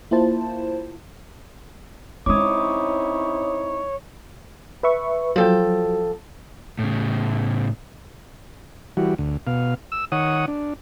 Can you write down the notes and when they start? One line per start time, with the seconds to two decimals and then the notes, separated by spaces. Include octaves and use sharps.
0.11 A#3 E4 F4 C5 A5
2.26 G#3 C4 C#4 D#4 E4 C#5 D6 D#6
4.83 B4 E5 C#6
5.36 F3 F#3 A4 G5
6.79 A2 C#3
8.97 E3 G3 F#4
9.18 D2
9.47 B2 F5
9.92 E6
10.12 D#3 C#5 F#5 D#6
10.48 D4